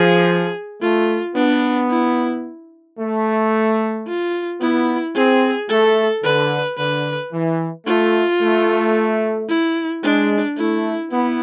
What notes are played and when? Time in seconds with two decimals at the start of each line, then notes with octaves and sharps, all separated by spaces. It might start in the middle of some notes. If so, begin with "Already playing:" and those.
Already playing: F3 G#4
0.81 A3 F4
1.35 B3 D4
1.90 E4
2.99 A3
4.07 F4
4.61 B3 E4
5.15 C4 G#4
5.69 A3 A4
6.24 D3 B4
6.78 D3 B4
7.32 E3
7.86 A3 F4
8.41 A3
9.49 E4
10.04 G#3 D4
10.58 A3 E4
11.12 B3 E4